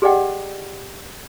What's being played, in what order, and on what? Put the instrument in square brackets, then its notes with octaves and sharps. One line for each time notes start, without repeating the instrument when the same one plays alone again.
[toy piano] G4 G#4 D5 D#5 F#5 G5